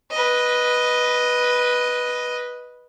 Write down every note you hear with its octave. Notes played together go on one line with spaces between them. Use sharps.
B4 D#5